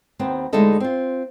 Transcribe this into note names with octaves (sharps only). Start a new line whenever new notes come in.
D#2 B3 C4
D2 G#3 D#4 E4 A4 D#5
C4 F4